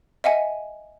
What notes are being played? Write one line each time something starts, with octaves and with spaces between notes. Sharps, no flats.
D#5 E5 F#5 G#5